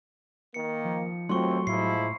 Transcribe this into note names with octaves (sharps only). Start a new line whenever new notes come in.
D#3 A#3 C#7
F3
D#2 F#3 A3 C4 F4 C6 C#6
A2 F3 G#3 E4 C7